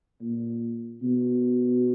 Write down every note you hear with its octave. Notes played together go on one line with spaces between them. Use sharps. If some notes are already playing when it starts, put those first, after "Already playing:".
A#2
B2